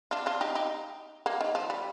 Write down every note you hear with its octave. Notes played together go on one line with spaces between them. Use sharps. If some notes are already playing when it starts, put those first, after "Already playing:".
D4 F4
D4 F4
D#4 G4
D#4 G4
A#3 D4
D#3
F3
G3